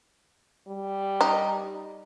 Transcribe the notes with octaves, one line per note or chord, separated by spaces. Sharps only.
G3
D#4